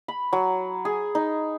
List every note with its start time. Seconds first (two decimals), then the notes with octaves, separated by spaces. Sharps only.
0.08 B5
0.33 F#3
0.85 G#4
1.15 D#4